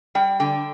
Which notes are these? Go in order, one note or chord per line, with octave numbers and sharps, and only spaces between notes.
G3 G5
D3 G5